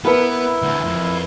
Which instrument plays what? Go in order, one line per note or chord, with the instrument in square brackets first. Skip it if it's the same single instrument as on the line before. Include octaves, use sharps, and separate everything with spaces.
[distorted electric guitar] B3 [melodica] E4 [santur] A#4 B4
[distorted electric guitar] D2 E3
F2